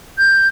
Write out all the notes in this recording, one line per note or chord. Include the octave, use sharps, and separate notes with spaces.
G6